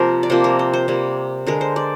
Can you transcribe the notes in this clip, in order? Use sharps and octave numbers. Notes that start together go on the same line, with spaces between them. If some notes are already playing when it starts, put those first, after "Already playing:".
Already playing: C3 F3 A#3 A#4 C5
D5
C3 F3 A#3 C5
A#4
C5
C5
C3 G3 A#3
D3 G#3 A#4
C5
D5